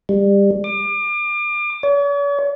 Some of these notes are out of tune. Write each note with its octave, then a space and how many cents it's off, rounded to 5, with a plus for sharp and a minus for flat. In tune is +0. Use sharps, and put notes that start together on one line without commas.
G3 +25
D6 +35
C#5 +45